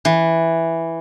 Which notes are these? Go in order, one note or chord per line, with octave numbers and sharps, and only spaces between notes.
E3